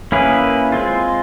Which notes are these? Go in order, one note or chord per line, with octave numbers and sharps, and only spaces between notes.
A#3 C#4 E4 G#4 B4
G#3 C4 F4